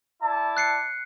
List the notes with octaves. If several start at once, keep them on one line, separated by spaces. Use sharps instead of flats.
E4 D5 A5
F#6 C7 C#7